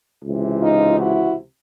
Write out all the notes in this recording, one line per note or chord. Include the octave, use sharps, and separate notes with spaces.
C#2 C3 E3
D#4 F4
E4 F#4